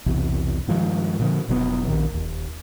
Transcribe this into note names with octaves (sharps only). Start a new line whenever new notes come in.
B1 E2 C3
G2 D#3 F3 G#3
A#2 D3 F3
F1 B2 F#3 B3
A#1 D#2 A#2 D#3
D#1 D#2